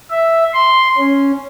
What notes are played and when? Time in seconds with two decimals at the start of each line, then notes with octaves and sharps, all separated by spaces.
0.11 E5
0.54 C6
0.98 C#4